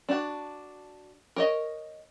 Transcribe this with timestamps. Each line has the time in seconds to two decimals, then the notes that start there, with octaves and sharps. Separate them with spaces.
0.09 D4 F#4
1.36 A#4 C#5 D#5